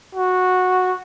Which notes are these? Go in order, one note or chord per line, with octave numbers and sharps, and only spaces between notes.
F#4